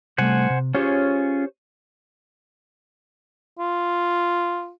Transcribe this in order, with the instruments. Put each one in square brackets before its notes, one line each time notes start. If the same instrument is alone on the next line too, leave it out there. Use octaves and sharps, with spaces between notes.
[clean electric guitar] C3 G3 A3 [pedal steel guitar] C5 F#5 G#5
[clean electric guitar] C3
[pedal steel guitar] C#4 F4 G#4 [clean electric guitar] G4 C5 C#5
[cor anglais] F4